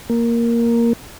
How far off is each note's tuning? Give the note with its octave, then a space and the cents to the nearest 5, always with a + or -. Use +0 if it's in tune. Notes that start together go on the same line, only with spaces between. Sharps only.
A#3 +0